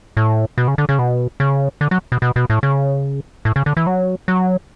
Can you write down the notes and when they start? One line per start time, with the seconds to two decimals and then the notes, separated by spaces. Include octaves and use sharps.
0.17 A2
0.58 B2
0.68 C#3
0.78 D3
0.89 C#3
0.99 B2
1.40 C#3
1.81 D3
1.91 F#3
2.12 B2
2.22 B2
2.36 B2
2.50 A2
2.63 C#3
3.45 A2
3.56 C#3
3.66 D3
3.77 E3
3.87 F#3
4.28 F#3